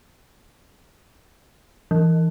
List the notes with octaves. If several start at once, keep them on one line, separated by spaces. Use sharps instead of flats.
E3